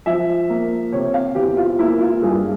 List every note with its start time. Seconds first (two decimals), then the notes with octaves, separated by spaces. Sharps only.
0.06 F3 E5
0.49 A#3
0.93 C3 C#5
1.14 F5
1.35 E2 G4
1.57 F4
1.79 A#3 E4
2.01 F4
2.22 G2 G#4